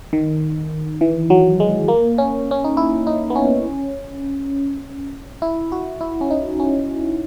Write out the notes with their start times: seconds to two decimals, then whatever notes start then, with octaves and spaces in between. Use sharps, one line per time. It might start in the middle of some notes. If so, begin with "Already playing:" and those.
0.13 D#3
1.01 E3
1.30 F#3
1.60 G#3
1.88 A#3
2.18 C#4
2.51 C#4
2.64 D#4
2.77 E4
3.07 D#4
3.30 B3
3.36 C#4
5.42 E4
5.72 F#4
6.01 E4
6.21 C#4
6.31 D#4
6.60 C#4